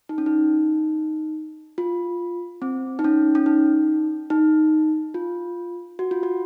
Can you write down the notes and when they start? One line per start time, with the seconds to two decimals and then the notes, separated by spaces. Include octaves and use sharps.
0.09 D#4
0.18 C#4
0.26 D#4
1.78 F4
2.62 C4
2.99 D#4
3.04 C#4
3.35 C#4
3.46 D#4
4.30 D#4
5.14 F4
5.99 F#4
6.11 F4
6.23 F#4